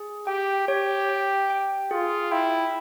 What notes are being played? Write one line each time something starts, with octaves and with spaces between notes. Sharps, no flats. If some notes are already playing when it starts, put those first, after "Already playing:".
Already playing: G#4
G4 G5
G4 C#5
G5
G5
F4 G#4
E4 G5